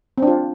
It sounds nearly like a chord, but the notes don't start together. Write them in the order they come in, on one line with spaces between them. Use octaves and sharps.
C4 D4 F4